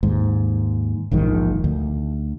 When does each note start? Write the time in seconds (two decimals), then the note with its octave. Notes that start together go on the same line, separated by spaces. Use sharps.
0.03 D#2 G#2
1.11 E1 A#1 G#2 D#3
1.64 D2